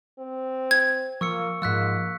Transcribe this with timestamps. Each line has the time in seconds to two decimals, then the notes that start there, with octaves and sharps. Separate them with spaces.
0.19 C4
0.71 G#6
1.21 F3 A#3 C#6 E6 C#7
1.62 G#2 F3 A#3 E6 F#6 B6